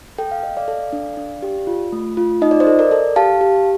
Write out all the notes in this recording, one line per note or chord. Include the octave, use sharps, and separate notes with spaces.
A4 G5
F5
A4 D#5
D5 F5
A4
D4
D4
G4
F4
A3
F4
D#4 D#5
D5
C5 D#5
A4
A#4 D5
A4
G4 F5 A5
G4